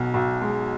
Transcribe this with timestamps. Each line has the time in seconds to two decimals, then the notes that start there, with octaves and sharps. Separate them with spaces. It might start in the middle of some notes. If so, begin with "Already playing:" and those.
Already playing: B1 B2
0.14 B1
0.41 G#3